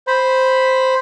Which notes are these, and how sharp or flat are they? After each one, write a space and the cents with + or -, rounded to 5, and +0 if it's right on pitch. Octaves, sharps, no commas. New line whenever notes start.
C5 +0 B5 +0